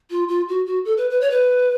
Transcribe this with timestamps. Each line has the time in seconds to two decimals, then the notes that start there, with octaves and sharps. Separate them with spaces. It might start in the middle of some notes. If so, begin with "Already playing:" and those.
0.11 F4
0.28 F4
0.48 F#4
0.66 F#4
0.85 A4
0.97 B4
1.10 B4
1.21 C#5
1.30 B4